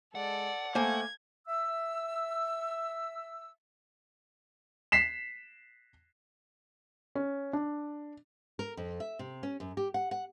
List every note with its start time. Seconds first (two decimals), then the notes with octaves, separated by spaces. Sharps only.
0.15 G#3 A4 D5 F#5
0.75 A3 A#3 C5 G#5 G#6
1.48 E5 E6
4.92 B6 C7 E7
7.15 C#4
7.53 D4
8.59 A#4
8.77 F2
9.00 E5
9.19 C3
9.43 C#4
9.60 F#2
9.77 G4
9.94 F#5
10.11 F#5